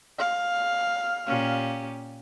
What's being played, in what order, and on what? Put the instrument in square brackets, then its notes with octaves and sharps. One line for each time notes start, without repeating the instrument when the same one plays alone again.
[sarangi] F5
[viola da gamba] A#2 C#4 G4